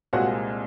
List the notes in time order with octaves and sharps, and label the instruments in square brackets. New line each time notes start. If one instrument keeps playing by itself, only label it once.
[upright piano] C2 A#2 G#3 C4 F#4 F#5